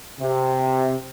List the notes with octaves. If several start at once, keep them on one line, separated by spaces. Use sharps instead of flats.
C3